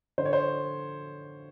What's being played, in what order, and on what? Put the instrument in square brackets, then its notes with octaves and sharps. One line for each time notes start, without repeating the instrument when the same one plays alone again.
[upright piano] D3 C5
C#5
C5